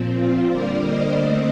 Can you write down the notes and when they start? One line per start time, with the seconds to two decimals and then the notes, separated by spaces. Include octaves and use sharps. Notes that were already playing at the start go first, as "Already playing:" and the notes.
Already playing: A#2 F3 C4
0.16 F4
0.49 D3 G3 A#3 A#4 D5
0.83 C5 D#5
1.17 D3 A3 C4 C5 D#5